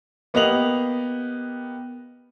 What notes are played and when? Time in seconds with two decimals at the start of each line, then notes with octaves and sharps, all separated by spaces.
0.34 A#3 B3 G4 D#5 F7 F#7